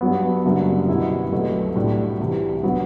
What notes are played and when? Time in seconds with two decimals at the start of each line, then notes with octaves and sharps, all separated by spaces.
0.01 G2 F#3 B3
0.45 F#1 F#2 D3 G3
0.88 B2 G3 B3 E4
1.32 C2 B2 F#3 A3
1.76 A2 G3 D4 F#4
2.20 C2 C3 E3
2.63 D3 F#3 B3